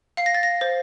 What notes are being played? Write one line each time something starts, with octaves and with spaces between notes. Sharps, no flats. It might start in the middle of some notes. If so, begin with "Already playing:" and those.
F5 C7
A#6
A6
A#6
C5